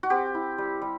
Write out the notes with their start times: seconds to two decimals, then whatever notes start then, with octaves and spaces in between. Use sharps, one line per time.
0.03 F#4
0.10 C4 G4
0.35 E4
0.58 G3
0.82 G3